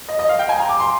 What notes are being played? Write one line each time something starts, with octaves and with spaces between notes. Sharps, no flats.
D#5
D#5
F5
G5
G#5
A#5
D6
C6